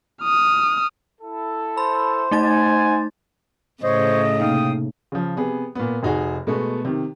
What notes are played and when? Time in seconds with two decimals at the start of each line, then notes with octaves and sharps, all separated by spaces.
0.23 D#6 F6
1.20 E4 A4
1.77 C5 B5
2.31 A3 D#4 D#5 F#5 G#5 A6
3.83 A2 C#3 C5 C#5 D#5
4.40 C3 A#3 D#4 F5 G5 D#6
5.12 C#3 F3
5.37 C3 B3 G#4
5.75 A#2 B3
6.03 F1 D#4 F#4 G#4
6.47 B2 G#3 A3 B3
6.85 C3 D#3